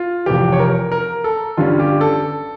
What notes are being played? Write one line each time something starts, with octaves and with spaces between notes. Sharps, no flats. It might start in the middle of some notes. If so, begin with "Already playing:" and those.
Already playing: F4
F1 F2 E3 G4
C#5
A#4
A#4
A4
G1 G2 D3 G3 C#4 F4
G4
A4